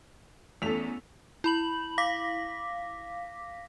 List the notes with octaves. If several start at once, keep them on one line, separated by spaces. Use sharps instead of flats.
E2 A3 B3 C#4 A4 B6 F7
E4 B5 F#7
F5 D6 A#6 B6